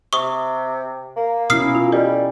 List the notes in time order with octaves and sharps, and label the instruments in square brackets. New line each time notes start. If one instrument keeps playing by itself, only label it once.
[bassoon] C3 [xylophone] C#6 D#6
[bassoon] A#3
[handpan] B2 C#4 E4 [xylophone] D#6 F6 C7
[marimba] F4
[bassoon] G3 [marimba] G4 A4 D#5